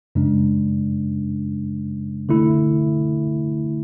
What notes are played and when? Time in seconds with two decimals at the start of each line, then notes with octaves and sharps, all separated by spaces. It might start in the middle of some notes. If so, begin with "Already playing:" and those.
0.15 F#2 C#3 G#3 D4
2.29 D3 A3 E4